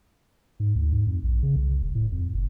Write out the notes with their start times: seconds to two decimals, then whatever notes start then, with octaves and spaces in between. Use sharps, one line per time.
0.60 G#2
0.75 D2
0.92 G#2
1.07 F2
1.23 A#1
1.43 C#3
1.56 C2
1.82 E1
1.95 A2
2.12 F2
2.34 F#1